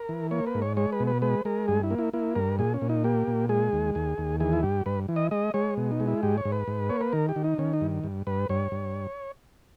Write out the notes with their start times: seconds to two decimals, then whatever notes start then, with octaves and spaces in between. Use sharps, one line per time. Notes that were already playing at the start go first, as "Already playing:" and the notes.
Already playing: A#4
0.09 E3
0.31 A#3 C#5
0.47 B4
0.55 G#2
0.62 C#5
0.77 G#3 C#5
0.92 B4
1.00 B2
1.07 B4
1.22 G#3 B4
1.45 G#3 A#4
1.68 G2 G#4
1.83 E4
1.90 A#3
1.99 E4
2.13 A#3 E4
2.35 G2 A#4
2.59 A#2 G#4
2.74 C#4
2.81 A#2
2.89 D#4
3.04 A#3 G4
3.27 A#2
3.49 G#3 G#4
3.73 D#2
3.95 D#2 G#4
4.18 D#2
4.40 E3 G#4
4.53 E4
4.63 G2 G4
4.86 G2 B4
5.08 E3
5.16 D#5
5.31 G#3 D#5
5.54 G#3 C#5
5.77 B2
5.91 D#4
6.00 G#3
6.07 E4
6.23 G#2 G4
6.38 C#5
6.45 G#2
6.52 B4
6.68 G#2
6.89 A#3 C#5
7.01 B4
7.13 D#3 A#4
7.29 G4
7.36 D#3
7.44 D#4
7.58 D#3 C#4
7.73 D#4
7.81 G2
8.04 G2
8.27 G2 B4
8.49 G2 C#5
8.72 G2